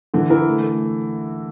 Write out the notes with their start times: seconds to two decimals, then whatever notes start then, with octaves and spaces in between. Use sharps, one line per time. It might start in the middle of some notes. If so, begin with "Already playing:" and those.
0.14 D3 E3
0.30 E3 A#4
0.47 A3
0.62 A3